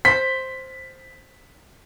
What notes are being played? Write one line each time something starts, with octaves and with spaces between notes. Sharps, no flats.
C5 B6